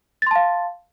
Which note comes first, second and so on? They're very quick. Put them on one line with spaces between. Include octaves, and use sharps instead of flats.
A6 C6 A5 F5